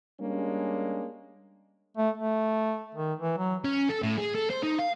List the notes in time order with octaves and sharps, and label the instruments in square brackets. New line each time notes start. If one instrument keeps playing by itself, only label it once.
[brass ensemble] G3 G#3 A#3 C#4 D4
[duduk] A3
A3
D#3
E3
F#3
[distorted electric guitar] C#4
A4
A2
G#4
A4
C5
D#4
F5